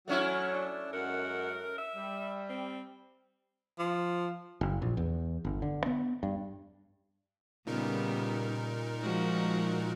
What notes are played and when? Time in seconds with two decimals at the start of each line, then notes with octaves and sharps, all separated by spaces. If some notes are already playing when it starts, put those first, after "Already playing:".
0.08 F#3 A3 C#4 E4
0.53 D4
0.93 F#2 G#3 A#4 F#5
1.78 E5
1.96 G3
2.49 C4
3.79 F3
4.61 F#1
4.82 A#1
4.97 E2
5.45 G1
5.62 D3
5.86 B3
6.23 G2
7.67 A#2 C#3 G3 B3 D#4 A#4
9.02 F3 G#3 F#4